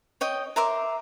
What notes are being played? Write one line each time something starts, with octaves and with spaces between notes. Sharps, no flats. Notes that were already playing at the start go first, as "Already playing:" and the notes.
C#5 D#5 G5
A#4 E5 C6 D6